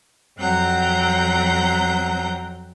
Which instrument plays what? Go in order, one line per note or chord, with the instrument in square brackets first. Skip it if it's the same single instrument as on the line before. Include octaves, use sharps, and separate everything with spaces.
[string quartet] F2 F#3 C4 F#5 A#5 G6